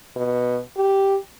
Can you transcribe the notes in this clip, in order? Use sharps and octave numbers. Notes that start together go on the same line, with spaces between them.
B2
G4